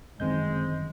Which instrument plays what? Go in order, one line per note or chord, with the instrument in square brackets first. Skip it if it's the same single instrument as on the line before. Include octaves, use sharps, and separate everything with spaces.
[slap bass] G1 F#2 E3 [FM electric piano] D#3 C4 G6 [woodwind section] G#3